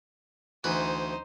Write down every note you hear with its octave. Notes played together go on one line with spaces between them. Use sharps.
D2 E3 D#4 B4 C5